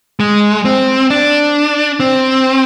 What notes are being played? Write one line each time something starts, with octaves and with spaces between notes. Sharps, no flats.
G#3
C4
D4
C4